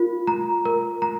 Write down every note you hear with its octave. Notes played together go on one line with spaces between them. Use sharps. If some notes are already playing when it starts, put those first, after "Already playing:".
Already playing: F4 A#4
A#5
A#4
A#5